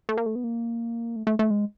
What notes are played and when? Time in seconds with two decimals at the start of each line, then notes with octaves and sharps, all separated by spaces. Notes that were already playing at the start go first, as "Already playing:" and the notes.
0.09 A3
0.17 A#3
0.26 A3
0.35 B3
0.44 A#3
1.16 A3
1.27 A3
1.39 A3
1.50 G#3